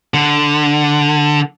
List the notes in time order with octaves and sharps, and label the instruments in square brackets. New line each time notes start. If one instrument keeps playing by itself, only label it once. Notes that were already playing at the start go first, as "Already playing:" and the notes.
[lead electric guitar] D3